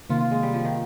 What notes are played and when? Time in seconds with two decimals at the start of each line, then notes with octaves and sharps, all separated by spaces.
0.10 C3 D#3 A#3 F4
0.20 F4
0.31 G#3
0.43 G3
0.54 F3
0.65 D#3